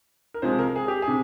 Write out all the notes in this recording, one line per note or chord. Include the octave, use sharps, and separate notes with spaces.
A#4
C3 F3 G#3 C5
A#4
G#4
G4
G#4
C3